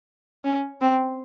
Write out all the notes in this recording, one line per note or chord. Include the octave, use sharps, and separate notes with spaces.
C#4
C4